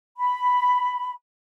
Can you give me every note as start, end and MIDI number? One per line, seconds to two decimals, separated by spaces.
0.17 1.12 83